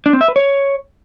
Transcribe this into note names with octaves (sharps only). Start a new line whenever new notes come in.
D4
C4
E5
B4
C#5